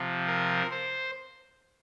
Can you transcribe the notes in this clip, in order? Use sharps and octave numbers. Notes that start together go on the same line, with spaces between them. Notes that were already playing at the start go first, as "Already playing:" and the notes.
Already playing: C3 F3
A#4
C5